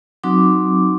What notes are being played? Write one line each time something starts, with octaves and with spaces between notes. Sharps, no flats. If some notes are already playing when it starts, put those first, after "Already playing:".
F#3 C4 D#4 F#4 D6